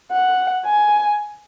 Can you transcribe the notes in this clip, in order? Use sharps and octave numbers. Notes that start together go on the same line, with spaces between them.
F#5
G#5